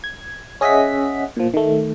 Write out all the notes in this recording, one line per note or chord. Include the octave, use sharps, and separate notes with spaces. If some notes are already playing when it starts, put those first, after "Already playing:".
G#6
C#4 G#4 D#5 E5 F#5 B6
A#2 F3
D#3 A3